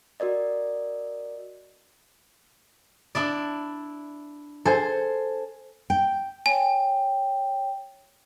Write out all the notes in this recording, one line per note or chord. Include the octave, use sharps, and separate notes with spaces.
F#4 A#4 D5 D#5
D4 E4 D5
A4 C5 G#5
G5
C#5 G5 G#5